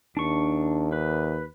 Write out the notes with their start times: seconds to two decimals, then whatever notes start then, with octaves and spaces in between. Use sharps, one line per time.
0.17 D#2 D4 C#6
0.92 B4